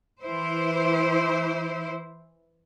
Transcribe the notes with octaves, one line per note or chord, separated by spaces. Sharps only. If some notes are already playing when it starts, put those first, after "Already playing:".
E3 E4 C5